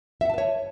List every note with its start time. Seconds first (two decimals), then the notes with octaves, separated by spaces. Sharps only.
0.21 E5
0.25 F#5
0.30 A5
0.34 B4
0.38 C#5